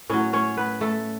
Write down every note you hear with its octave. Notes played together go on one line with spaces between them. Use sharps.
A2 F#3 C#4 C#5
C#4 C#5
B3 B4
A3 A4